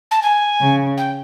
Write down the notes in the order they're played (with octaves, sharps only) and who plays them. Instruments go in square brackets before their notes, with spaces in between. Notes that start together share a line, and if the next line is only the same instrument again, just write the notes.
[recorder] A5
G#5
[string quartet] C#3
[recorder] G5